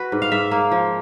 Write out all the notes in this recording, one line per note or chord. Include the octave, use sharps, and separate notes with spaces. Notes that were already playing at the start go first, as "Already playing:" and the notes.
Already playing: F#4 B4
G#2
F5
G#2 E5
A#3
F3